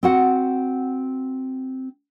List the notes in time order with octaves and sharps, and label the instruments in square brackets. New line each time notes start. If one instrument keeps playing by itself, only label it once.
[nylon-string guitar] C4 F#4 F#5